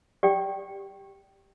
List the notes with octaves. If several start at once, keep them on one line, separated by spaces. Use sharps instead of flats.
G4 D5 G5